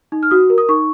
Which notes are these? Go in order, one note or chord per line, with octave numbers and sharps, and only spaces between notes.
D#4
F6
F#4 D#6
A#4
D#6
D#4 C#6